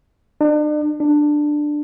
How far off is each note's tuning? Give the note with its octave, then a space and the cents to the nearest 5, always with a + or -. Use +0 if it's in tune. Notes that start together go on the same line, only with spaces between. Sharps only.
D4 +40
D4 +10